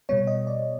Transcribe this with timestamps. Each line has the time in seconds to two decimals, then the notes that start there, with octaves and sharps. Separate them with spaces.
0.09 B2 G3 B3 C#5
0.27 D#5
0.47 D5